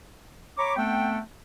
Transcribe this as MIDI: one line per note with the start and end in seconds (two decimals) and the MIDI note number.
0.58 0.77 73
0.58 0.77 82
0.58 0.77 83
0.58 0.77 85
0.58 0.77 86
0.77 1.18 57
0.77 1.18 59
0.77 1.18 60
0.77 1.18 69
0.77 1.18 78
0.77 1.18 79